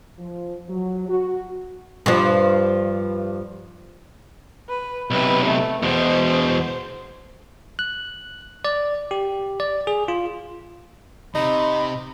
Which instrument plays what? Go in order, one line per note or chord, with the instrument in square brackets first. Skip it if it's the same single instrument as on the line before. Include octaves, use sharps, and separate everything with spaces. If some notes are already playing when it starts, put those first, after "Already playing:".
[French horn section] F3
F#3
F#4
[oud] G2 F3
[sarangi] B4
[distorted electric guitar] B1 C3 [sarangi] B4
[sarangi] A3
[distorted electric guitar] E2 B2 [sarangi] C5
[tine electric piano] F#6
D5
G4
D5
G#4
F4
[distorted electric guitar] C3 [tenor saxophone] D#4 [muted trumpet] B5